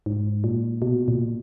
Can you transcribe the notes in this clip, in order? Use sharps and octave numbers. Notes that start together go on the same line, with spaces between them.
G#2
A#2
B2
A#2